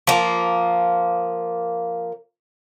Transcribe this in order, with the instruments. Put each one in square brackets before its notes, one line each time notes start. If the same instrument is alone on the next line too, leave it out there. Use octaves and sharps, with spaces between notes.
[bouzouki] F3 A#3